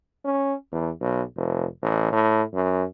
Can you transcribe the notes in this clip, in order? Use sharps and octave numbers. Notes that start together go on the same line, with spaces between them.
C#4
E2
B1
F1
A1
A2
F#2